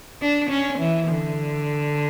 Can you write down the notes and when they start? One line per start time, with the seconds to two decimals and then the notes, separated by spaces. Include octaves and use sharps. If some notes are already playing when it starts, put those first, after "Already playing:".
0.22 D4
0.50 C#4
0.79 E3
1.08 D3